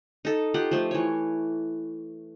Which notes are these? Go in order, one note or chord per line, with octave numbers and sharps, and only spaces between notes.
D#4 A4
F4 G4 F#5
F3 A3
E3 C#5